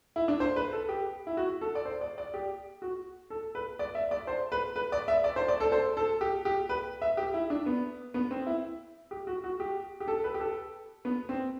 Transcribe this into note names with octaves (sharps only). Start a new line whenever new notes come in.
E4
D4
C5
B4
A4
G4
E4
F#4
A4
D5
C5
D5
D5
G4
F#4
A4
B4
D5
E5
D5
C5
B4
B4
D5
E5
D5
C5
D5
A4
C5
A4
G4
G4
B4
E5
G4
E4
D4
B3
B3
C4
E4
G4
F#4
F#4
G4
G4
A4
B4
G4
A4
B3
C4